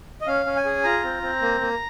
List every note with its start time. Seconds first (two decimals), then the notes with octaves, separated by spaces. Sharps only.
0.21 D#5
0.27 C#4 F5
0.46 C#4
0.56 G#5
0.65 G#4
0.84 F4 A#5
1.04 C4
1.22 C4
1.41 A#3
1.60 A#3